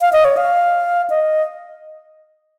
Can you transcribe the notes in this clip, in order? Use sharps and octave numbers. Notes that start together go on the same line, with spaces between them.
F5
D#5
C#5
F5
D#5